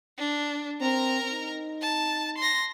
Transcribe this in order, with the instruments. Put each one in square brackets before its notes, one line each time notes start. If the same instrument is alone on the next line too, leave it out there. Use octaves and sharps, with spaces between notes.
[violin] D4
[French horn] C4 [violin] A#4 A#5
[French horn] D#4
[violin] A5
C6 A#6